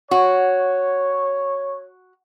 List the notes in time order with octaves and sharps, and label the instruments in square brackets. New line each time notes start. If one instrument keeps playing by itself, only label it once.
[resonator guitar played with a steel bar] F#4 [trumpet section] C#5